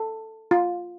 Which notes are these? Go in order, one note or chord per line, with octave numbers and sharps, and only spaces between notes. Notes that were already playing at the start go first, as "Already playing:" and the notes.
Already playing: A4
F4